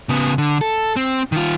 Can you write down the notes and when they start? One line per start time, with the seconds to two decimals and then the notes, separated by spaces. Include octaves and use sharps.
0.09 C#3 B3
0.38 D3
0.61 A4
0.96 C4
1.32 D#3 F4